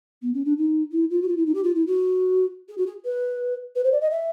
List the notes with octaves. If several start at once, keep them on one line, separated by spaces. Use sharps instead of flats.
B3
C#4
D4
D#4
E4
F4
F#4
F4
E4
D#4
G4
F4
E4
F#4
G#4
F#4
G#4
B4
B4
C5
D5
D#5
E5